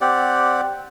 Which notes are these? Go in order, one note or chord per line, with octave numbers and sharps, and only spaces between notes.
C4 G4 D5 F#5